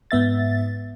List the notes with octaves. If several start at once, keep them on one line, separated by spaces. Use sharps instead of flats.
G#2 B3 E5 A6